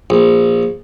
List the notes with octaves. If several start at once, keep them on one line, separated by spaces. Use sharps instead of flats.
A#1